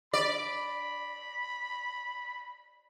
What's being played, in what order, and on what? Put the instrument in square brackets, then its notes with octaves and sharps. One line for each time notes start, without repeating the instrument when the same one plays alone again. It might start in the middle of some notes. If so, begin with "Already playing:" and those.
[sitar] D5 [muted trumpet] B5